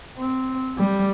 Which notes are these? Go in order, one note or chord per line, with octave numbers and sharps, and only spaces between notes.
C4
G3